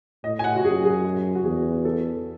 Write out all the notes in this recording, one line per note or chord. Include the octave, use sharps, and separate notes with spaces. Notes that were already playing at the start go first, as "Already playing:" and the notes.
A2 D#5
G#5
F#5
F#4
F#2 G#4
G#4
F#4
E2 G#4
A4